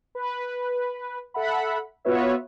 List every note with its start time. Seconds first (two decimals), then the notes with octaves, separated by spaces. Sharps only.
0.15 B4
1.34 A4 E5 F#5 B5
2.05 B3 F4 F#4 B4 C#5 E5